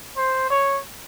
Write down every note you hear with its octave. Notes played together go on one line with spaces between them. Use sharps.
C5
C#5